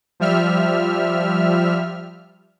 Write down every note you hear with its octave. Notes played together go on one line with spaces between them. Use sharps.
F3 G3 E5 F6